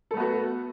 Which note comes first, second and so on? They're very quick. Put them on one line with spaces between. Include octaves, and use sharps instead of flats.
A4 A3 B3 F#4